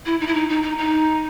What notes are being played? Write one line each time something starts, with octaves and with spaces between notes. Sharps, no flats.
E4
D#4
E4
D#4
D#4
D#4
D#4